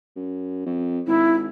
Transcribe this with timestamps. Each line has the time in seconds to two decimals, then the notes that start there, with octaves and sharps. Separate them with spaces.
0.16 F#2
0.66 F2
1.07 G#1 E4